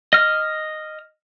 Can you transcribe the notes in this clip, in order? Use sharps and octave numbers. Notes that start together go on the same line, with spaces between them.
D#5 F6